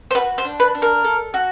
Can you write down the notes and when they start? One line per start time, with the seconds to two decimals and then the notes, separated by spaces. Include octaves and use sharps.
0.11 C5
0.15 F#4 B4
0.38 C5
0.45 D4
0.60 B4
0.75 D4
0.82 A#4
1.04 A4
1.34 F#4